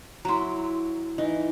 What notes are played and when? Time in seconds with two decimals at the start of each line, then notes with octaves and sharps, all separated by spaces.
0.25 F#3 E4 A#5 C6
1.18 E3 D#4